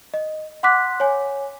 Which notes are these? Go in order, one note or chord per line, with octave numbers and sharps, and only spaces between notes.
D#5
F#5 C6 D6 F#6 B6
C#5 G#5